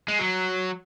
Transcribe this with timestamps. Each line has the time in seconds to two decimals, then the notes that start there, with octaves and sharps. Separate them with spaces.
0.08 G#3
0.19 F#3